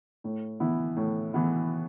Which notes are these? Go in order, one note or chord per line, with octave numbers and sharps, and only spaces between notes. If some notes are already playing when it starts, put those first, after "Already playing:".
A2
E3 B3 E4
A2
E3 B3 E4